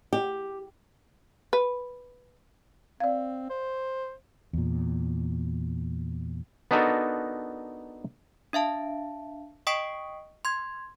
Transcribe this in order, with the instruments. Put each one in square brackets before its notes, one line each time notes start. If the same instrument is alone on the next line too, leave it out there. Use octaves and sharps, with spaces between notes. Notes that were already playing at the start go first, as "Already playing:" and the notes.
[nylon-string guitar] G4
[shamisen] B4
[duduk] C4 [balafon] D5 F5
[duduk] C5
[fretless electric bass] E2 A#2
[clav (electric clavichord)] B3 D4 D#4 F#4 A4 A#4
[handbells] D4 E5 F5 A5
D#5 G5 C#6 D#6 B6 D7
C6 G#6